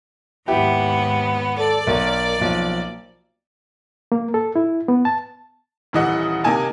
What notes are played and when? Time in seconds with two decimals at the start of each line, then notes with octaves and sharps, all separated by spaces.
0.48 D#2 G#2 B3 E4 G4
1.58 A4 D5
1.87 B1 A#4
2.39 B1 F3 A#3
4.12 A#3
4.34 A4
4.56 E4
4.88 B3
5.05 A5
5.93 D#1 E3 D#5 F#5
6.44 C3 A#3 D#4 G#5 A5